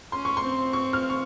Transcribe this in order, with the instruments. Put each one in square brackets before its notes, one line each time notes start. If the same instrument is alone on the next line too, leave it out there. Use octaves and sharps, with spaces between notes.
[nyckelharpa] C#4 [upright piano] C6
[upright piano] C#6
C6
[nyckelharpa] C4
[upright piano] C#6
F6
C#6